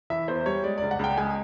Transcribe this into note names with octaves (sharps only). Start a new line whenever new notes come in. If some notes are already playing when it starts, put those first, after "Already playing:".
E3 E5
E2 C5
G3 C#5
G#3 D5
C#2 D5
F#5
C#2 G5
G#3 G#5